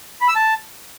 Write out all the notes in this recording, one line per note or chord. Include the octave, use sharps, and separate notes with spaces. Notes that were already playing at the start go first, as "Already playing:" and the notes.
B5
E6
A5